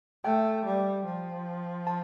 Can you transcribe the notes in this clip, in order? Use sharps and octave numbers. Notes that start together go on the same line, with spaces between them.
A3 G5
G3
F3
A5